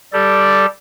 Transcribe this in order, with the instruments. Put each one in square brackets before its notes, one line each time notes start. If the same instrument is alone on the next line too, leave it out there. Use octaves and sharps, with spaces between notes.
[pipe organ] G3 G4 A4 D5